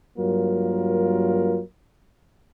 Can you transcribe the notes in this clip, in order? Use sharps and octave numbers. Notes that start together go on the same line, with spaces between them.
G2 F#3 A#3 F4 A#4